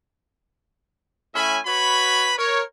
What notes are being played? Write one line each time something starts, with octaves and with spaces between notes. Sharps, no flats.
A2 C#4 E5 G#5 B5
F#4 B4 C#5 B5
A#4 C#5